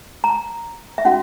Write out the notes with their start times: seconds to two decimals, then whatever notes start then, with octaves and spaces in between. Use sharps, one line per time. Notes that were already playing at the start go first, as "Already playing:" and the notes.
0.24 A#5
0.98 E5
1.05 C#4 F#4 F#5